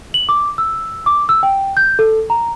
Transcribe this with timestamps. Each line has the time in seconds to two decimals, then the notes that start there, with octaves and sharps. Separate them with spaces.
0.14 F#7
0.29 D6
0.58 E6
1.06 D6
1.29 E6
1.43 G5
1.77 G6
1.99 A4
2.30 A#5